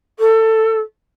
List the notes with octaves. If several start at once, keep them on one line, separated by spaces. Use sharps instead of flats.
A4